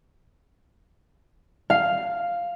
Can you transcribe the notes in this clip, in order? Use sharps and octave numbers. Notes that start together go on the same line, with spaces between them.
F5